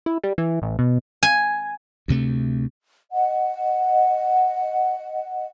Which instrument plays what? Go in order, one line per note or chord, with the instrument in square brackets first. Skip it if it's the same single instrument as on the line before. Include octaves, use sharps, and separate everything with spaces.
[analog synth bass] E4
G3
E3
A1
B2
[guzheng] G#5
[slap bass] D2 C3 A3
[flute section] D#5 F#5